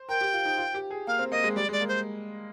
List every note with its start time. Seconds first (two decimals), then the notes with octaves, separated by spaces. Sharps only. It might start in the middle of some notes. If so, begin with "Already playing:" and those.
Already playing: C5
0.09 A#4 G5
0.21 G4
0.33 F4
0.45 D#4
0.58 F4
0.74 G4
0.91 G#4
1.07 A#3 F5
1.19 C4
1.31 A#3 D#5
1.44 G#3
1.56 G3 D5
1.69 G#3
1.72 D5
1.81 A#3
1.88 C5